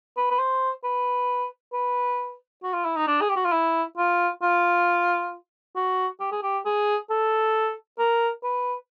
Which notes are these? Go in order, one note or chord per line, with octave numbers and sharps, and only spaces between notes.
B4
B4
C5
B4
B4
F#4
F4
E4
D#4
D4
G#4
G4
F#4
F4
E4
F4
F4
F#4
G4
G#4
G4
G#4
A4
A#4
B4